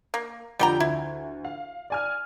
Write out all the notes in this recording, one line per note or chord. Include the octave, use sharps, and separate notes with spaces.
A#3
F2 D3 F3 G3 G5 A#5
D2 E4
F5
D5 G#5 F6